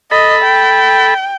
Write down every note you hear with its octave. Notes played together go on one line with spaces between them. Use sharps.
A4 D#5 B5
G5